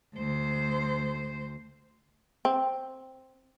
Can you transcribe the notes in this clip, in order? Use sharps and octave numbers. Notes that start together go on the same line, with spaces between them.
D2 C5
C4